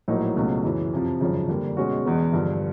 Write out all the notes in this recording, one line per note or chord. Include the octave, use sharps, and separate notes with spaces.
A#1 A2 F#3 A#3 D#4
C#2 B2 F#3 A3 C#4
F#2 C#3 E3
F2 C3 F3
G#1 F#2 C#3 F3
D3 G3 A#3
B2 G#3 C#4 F#4
E2 B2 G#3 B3
G2 D3 F3